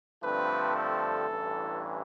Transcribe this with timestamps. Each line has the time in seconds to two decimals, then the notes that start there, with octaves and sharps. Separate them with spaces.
0.23 G2 D3 F3 A3 C4 B4
0.76 A4
1.29 A1 G2 E3